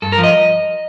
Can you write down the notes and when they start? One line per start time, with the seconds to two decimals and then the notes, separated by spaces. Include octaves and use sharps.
0.02 G2 A4
0.12 A#4
0.18 F3
0.23 D#5